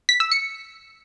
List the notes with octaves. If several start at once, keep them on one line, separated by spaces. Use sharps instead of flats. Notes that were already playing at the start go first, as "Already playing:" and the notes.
B6
E6
C#7